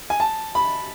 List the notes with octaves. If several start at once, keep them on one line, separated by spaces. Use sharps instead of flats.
G#5
A5
B5